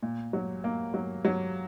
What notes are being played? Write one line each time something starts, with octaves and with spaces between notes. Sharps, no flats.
A#2
F#3
A#3
F#3
F#3